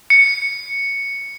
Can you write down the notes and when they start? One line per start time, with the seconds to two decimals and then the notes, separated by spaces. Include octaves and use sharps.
0.10 C#7